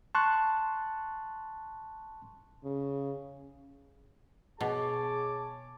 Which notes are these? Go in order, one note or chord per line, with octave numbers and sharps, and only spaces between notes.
A5 C6 C#6 F#6
C#3
B2 G#4 C#5 A5 D6